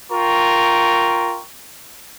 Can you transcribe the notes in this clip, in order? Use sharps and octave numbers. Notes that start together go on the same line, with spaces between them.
F4 A#4 G5 C#6